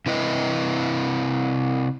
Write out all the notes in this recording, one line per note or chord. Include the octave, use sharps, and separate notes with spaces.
C3 E4 B4 D#5